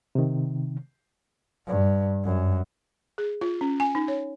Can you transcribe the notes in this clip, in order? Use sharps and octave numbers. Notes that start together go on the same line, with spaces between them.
C3 D#3
G2
F#2
G#4
F4
C#4
G#5
D#4
C#5